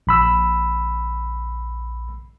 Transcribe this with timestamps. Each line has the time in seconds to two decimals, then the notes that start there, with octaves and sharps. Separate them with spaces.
0.07 A#1 B5 E6